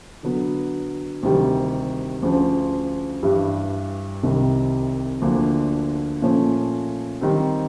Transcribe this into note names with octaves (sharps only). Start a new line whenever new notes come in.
D3 F#3 B3
D2 C3 D#3 G3
D2 C#3 F3
G2 E3 G3
C2 C3 D#3 G3
D2 D3 F3 A#3 D4
A#2 F3 A3 C#4
D#3 G3 C4